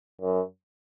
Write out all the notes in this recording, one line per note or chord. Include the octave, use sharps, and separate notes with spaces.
F#2